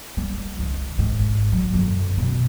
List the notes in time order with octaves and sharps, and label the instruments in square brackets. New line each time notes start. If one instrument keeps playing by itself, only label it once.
[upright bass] G3
C#2 D#3
G#1 G#2
F#3
F#2 D3
B2 C#4